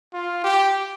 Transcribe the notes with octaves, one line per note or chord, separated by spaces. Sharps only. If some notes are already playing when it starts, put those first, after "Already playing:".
F4
G4